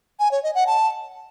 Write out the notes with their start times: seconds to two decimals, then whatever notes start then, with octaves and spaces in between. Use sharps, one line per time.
0.20 G#5
0.31 C#5
0.43 D#5
0.55 F#5
0.67 A5